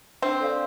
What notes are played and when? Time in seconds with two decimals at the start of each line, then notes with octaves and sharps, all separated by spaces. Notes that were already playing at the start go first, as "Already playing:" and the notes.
0.22 C4 D4
0.41 A4 D5 F5